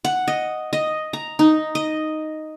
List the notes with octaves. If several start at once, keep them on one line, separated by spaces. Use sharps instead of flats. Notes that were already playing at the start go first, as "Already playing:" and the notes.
F#5
D#5
D#5
A#5
D#4
D#5